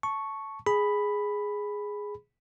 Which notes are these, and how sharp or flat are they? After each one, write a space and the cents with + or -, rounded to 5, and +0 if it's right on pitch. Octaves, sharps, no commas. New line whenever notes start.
A5 +0 C#6 +0
G#4 +0 B5 +0